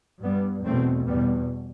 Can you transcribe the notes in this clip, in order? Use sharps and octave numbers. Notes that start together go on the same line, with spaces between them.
G2 G3 B3
E2 B2 A3 C4
E2 B2 G3 B3